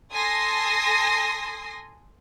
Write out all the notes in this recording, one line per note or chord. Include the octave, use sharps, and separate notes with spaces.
A4 G#5 C6 D#6 A#6 C7